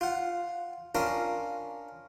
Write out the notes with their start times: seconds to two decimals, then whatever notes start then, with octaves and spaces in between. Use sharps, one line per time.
0.01 F4 F#5
0.95 C#4 D4 F4 A#4